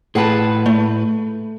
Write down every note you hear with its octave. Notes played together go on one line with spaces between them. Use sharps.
A2 G#4 B4 F#5 A5
A3